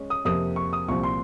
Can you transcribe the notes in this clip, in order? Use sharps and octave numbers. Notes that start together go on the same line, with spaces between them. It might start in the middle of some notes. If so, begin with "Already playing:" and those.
Already playing: G#3 C#4
D#6
F2 C3 F3 A#3 D#6
C#6
D#6
C2 A#2 F3 C4 C#6
C6